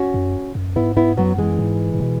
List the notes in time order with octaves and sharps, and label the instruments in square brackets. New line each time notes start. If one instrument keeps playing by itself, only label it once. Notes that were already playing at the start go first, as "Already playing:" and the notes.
Already playing: [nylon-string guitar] C#4 F#4
[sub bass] F#2
F#2
[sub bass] G#2 [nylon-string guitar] B3 E4
[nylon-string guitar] B3 E4
[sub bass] F#2 [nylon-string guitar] F#3 B3
[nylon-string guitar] E3 G#3
[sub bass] G#2
G#2
B2